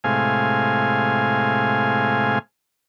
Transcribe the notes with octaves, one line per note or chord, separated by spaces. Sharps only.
A2 C3 G#3 F5 G#5